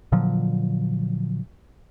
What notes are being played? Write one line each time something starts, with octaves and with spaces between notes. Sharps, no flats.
A#2 D3 F3 F#3